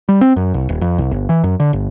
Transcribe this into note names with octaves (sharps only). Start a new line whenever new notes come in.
G3
C4
F#2
C2
D#1
F2
C2
G1
E3
F#2
D3
G1